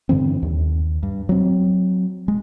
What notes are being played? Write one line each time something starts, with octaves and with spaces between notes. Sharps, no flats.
G2 D3 E3 C4
D#2
G2
F#3 C4
G#3